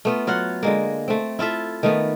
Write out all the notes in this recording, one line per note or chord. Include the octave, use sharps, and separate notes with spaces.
A3 B3 F4
F#3 F4 F5 F#5
D3 G#3 A#3
A3 C4
E4 F4 A4 E5
D#3 A3 B3